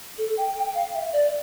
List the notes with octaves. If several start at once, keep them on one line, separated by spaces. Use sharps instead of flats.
A4
G5
G5
F5
E5
D5